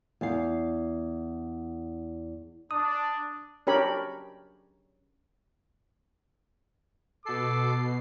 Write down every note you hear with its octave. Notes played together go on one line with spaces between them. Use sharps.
E2 F5
D4 D#6
C#4 D4 G4 A#4 C#5 B5
B2 A4 D6 C7